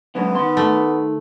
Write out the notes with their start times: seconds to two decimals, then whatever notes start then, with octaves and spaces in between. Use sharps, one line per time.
0.15 F#3 G#3 B3 C#4
0.35 D#3 C6
0.57 A3